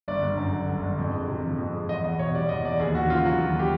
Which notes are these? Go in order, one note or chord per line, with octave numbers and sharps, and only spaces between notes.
G1 D5
G1
F#2
D3
G1
G1
F2
G#3
C3
F3
F2
G#3
E2 D#5
E2 D#5
B2 C#5
G3 D5
E2 D#5
E2 D5
D#2 G#4
D#2 F#4
C#3 F4
F#3 F#4
D#2
G4